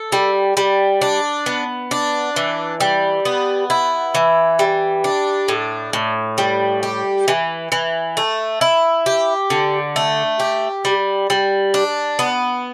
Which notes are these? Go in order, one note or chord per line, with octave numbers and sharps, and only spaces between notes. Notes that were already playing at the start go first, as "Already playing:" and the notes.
Already playing: A4
G3
G3
D4
B3
D4
E3
G3
B3
E4
E3
G3
D4
A2
A2
G3
G4
E3
E3
A3
E4
G4
D3
A3
G4
G3
G3
D4
B3